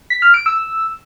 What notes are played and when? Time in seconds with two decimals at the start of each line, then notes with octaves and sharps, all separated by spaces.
0.10 B6
0.22 F6
0.34 D7
0.46 E6